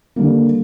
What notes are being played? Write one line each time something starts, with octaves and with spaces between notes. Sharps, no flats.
D3 G3 A#3